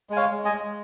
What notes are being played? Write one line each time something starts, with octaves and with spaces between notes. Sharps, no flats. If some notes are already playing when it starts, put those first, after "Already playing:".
G#3 G#5
C#5 F5
G#3
D#5 G#5
G#3